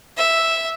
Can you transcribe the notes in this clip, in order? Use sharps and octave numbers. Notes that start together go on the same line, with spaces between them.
E5